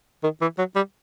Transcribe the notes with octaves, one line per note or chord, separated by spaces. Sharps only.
D#3
E3
F#3
G3